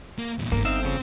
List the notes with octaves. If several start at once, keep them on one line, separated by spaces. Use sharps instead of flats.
A#3
E2 A#2
G1 G#2 A#3 A#4
C4 D#4 E5 F5
C#3 F3